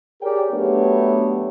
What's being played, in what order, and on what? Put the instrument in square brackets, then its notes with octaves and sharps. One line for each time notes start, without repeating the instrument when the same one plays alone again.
[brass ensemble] G4 G#4 A#4 C#5 D5 G5
F#3 A3 B3 D4 G4 C#5